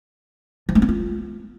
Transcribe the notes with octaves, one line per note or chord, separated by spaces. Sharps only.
F3
A3
B3
F4